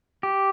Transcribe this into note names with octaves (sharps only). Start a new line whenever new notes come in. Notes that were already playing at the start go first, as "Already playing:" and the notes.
G4